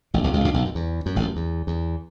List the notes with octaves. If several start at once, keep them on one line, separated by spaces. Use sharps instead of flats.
A1 A2
B1 B2
C#2 C#3
B2
C#2 C#3
B1 B2
F#2
E2
F#2
A1 A2
F#2
E2
E2